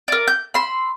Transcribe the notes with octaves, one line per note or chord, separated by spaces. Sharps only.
A#4 D5
G6
B5 C6 E6